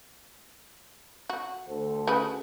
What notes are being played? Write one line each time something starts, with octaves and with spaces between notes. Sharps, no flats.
F#4
D2 A4 C5
C#3 F#4 B4